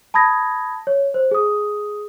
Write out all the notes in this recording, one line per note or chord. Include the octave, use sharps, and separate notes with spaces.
A5 B5 D#6 G#6 A#6
C#5
C5
G#4 D#6